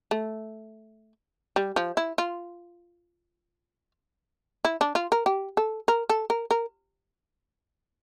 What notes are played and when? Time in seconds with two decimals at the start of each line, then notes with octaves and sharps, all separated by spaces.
0.11 A3
1.56 G3
1.76 F3
1.97 E4
2.18 F4
4.65 E4
4.81 D4
4.95 F4
5.12 A#4
5.26 G4
5.57 A4
5.88 A#4
6.10 A4
6.30 A#4
6.51 A#4